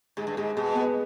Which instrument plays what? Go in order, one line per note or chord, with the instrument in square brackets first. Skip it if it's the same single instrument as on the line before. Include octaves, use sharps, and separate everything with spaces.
[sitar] G#2 [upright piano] G#3
[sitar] G2
[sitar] G#2 [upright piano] G#3
[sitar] B2 [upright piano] G#3
[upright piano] B3